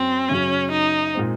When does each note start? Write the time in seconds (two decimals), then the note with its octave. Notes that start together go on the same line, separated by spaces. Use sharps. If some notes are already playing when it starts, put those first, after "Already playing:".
Already playing: F#2 F#3 C4
0.29 F#2 C#3 F#3 C#4
0.72 D#4
1.14 A#2 G#3 C4